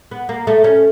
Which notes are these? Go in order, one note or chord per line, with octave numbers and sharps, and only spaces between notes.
B3
A#3
A3
C#4